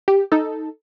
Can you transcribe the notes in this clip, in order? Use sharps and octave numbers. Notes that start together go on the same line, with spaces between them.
G4
D#4 A4